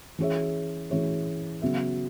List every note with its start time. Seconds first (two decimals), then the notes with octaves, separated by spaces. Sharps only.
0.18 E3 C#4 G#4 C#5 E5
0.90 E3 C#4 G#4 C#5 E5
1.62 C#3 F#3 B3 F#4 E5